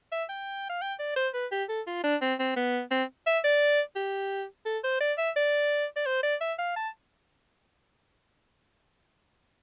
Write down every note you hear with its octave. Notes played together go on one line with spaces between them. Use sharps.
E5
G5
F5
G5
D5
C5
B4
G4
A4
F4
D4
C4
C4
B3
C4
E5
D5
G4
A4
C5
D5
E5
D5
D5
C5
D5
E5
F5
A5